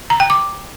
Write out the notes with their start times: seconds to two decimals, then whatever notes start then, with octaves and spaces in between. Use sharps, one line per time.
0.10 A#5
0.20 G5
0.30 D6